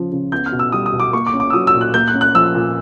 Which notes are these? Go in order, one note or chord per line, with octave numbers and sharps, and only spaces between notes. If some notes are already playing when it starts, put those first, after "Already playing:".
Already playing: C#3 F3
C#3
B3 G6
F6
B2
E6
G3 D#6
D#6
B2
D6
A#3 C#6
D6
C#4
D6
E6
F#3 D#6
E6
A#2
F#6
A#3 G6
F#6
C#4
F#6
F3 E6
A#2